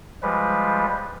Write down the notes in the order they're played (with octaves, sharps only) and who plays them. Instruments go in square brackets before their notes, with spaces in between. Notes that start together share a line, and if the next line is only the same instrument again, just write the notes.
[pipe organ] F3 G3 G#3 B4